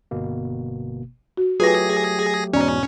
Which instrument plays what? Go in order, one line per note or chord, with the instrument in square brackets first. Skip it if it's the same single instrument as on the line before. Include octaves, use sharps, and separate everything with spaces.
[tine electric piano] G1 B2 A#3
[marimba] F#4
[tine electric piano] F#3 A3 G4 [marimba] F4 B4 [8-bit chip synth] G#4 A#6
[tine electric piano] E2 G#2 B2 [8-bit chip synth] C#4 [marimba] D5 A#5